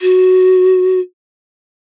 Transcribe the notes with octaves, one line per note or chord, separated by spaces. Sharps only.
F#4